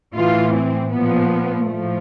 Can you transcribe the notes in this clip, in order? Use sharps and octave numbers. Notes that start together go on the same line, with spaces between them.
A2 E3 F4
C4
A#2 F3 B3
A2 F3 A3